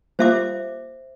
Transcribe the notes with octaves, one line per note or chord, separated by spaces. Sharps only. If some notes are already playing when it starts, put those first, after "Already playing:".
G3 A#3 F4 C5 E5 D6